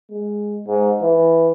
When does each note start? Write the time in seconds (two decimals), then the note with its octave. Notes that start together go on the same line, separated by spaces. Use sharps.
0.11 G#3
0.67 G#2
1.02 E3